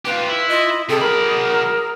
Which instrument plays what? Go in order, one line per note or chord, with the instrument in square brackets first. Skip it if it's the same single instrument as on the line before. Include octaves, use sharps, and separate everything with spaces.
[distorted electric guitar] F4 G4 [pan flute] B4
[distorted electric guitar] E4
[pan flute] F4 [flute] D#5
[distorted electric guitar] C3 [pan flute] G#4 [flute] A4
[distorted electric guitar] F#3 B5 [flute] A#4